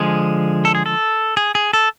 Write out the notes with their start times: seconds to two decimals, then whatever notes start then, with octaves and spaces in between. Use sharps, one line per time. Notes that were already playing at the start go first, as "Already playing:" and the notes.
Already playing: D3 F3 G#3 G#4
0.65 A4
0.75 G#4
0.86 A4
1.37 G#4
1.55 G#4
1.73 A4